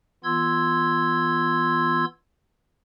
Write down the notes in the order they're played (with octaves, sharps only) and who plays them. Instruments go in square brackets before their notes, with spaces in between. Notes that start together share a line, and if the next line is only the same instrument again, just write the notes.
[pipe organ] E3 B3 F4 C6 E6 G#6